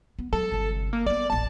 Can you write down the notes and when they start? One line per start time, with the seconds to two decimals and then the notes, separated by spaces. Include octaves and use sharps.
0.19 B3
0.33 F#3 G#3 A4
0.52 G1 C3
0.93 A#3
1.06 A#3 B3 D5
1.30 D#1 A1 A5